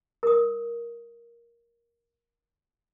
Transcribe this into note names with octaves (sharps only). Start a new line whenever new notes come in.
A#4 D#6